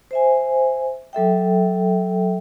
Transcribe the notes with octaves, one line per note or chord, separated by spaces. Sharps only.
C5 E5 G#5
F#3 A4 E5 G5